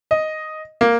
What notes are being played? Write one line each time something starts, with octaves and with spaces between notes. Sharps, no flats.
D#5
A#3